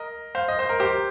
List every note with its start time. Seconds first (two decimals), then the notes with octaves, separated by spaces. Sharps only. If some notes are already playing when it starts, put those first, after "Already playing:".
Already playing: A#4 D#5
0.35 C5 F5
0.48 D#5
0.59 C5
0.69 A#4
0.80 G4 C5